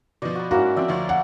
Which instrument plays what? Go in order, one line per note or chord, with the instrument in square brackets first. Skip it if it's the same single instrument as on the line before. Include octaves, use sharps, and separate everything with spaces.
[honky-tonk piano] B2 F3 [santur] D5
[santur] F#4 B5
[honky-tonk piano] G#2 E4 [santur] A#3 C#4 [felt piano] F#4
[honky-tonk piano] F3 C4 [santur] D5 E5 G5
[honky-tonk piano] D2 F3 C#5
[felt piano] F#5